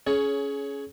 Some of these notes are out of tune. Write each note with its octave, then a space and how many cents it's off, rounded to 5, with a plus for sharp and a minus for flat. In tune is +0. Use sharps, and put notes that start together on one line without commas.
C#4 +10 G#4 +25 C#5 +0